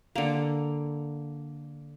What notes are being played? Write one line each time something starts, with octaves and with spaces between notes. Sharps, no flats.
D3 A#3